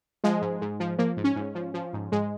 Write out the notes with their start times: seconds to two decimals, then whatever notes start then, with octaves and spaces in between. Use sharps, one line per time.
0.24 F3 G#3
0.42 G#2
0.61 G#2
0.80 F3
0.99 F3 A#3
1.17 G#2
1.24 C#4
1.36 G#2
1.55 F3
1.74 F3
1.93 G#2
2.12 G#2 G#3